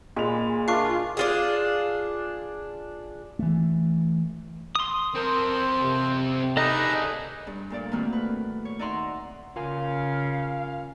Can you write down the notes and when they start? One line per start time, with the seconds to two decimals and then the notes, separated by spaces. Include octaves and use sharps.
0.16 A#2 G#3 B5 F7
0.68 D4 F4 A#4 E5 F5 C#6
1.17 D4 F4 G#4
3.39 E3 A3
4.75 C6 D#6
5.15 C4 A4 A#4 C5
5.80 C3
6.57 D4 D#4 G#4 A4 B4 D#5 A#5
7.47 G2
7.70 D2 A#2 D5
7.92 A2 D#3 A3 A#3 C4 F#4
8.13 B4
8.65 C#5
8.79 D#4 D5 E5 F#5 A#5 C6
9.56 C#3 F4 A#4 F5 G#5